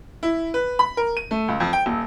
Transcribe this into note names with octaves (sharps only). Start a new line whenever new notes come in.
E4
B4
B5
A#4
D#7
A3
C#2
F2
G5
D#1